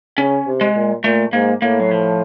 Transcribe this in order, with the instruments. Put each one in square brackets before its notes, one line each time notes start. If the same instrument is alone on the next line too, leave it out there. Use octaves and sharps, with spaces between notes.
[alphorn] C#3 [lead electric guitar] C#4
[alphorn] C3
[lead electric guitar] G#3
[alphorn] A#2
[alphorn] A#2 [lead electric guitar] A3
[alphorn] G#2 [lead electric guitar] A#3
[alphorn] A2 [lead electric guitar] A#3
[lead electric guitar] F#3
F3